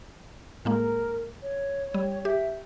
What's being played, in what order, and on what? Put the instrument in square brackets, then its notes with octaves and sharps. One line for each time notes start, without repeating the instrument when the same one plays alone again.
[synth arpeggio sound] A2 G#3 A#3 [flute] A#4
[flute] C#5
[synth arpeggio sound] G3
[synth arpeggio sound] G4 [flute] E5